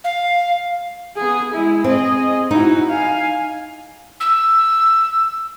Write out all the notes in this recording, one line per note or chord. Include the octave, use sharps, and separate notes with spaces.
F5
B3 G#4
G#3 E4
C4 G#4 D#5
D#4 E4 F#4
F5 G#5
E6